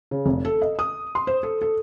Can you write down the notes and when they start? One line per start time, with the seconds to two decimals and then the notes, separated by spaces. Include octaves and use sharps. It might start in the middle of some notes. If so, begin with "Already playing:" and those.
0.11 C#3
0.26 F1
0.45 A4
0.62 D#5
0.79 D#6
1.15 C6
1.27 C5
1.43 A4
1.61 A4